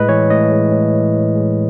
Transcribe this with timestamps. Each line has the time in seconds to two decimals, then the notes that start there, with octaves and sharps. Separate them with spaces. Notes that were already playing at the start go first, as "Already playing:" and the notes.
Already playing: A2 G#3 B4 D#5
0.09 E3 C#5
0.30 A2 D#5
0.52 G#3
0.72 A2
0.94 E3
1.15 A2
1.35 G#3